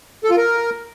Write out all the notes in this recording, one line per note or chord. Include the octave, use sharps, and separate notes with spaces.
A4
F4
A#4